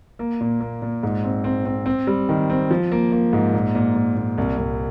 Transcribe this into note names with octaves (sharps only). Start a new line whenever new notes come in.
A#3
A#2
A#3
A#2
G#2
C4
C4
C4
C4
G3
D#3
C4
F3
A#3
A#3
G#2
A#2
A#2
A#2
A#2
C2
C2